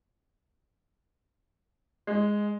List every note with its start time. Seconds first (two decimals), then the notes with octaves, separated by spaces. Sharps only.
2.07 G#3